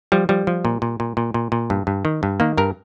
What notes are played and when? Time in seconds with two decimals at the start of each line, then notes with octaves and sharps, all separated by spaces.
0.12 F3 G3
0.29 F3 G3
0.47 F3
0.65 A#2
0.82 A#2
1.00 A#2
1.17 A#2
1.34 A#2
1.52 A#2
1.70 G2
1.87 G2
2.05 D#3
2.23 G2
2.40 D#3 A#3
2.57 G2 A#4